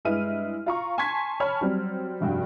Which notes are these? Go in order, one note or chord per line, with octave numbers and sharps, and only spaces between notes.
G2 G#3 E4 B4 F6 D#7
F4 A#5 C#6
G#5 A5 C6 C#6 G#6 B6
C#5 G#5 A5 B5 F6
F#3 G3 C4
F1 G2 F#4 G5